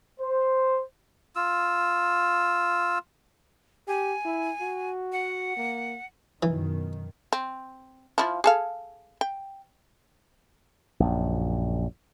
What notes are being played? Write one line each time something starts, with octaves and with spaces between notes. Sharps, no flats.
C5
F4 E6
G4 G#5
E4
F#4
F#5
A#3
F#2 B2 D#3 E3
C4
F3 E4 F4
G#4 A4 F5
G5
A#1 F#2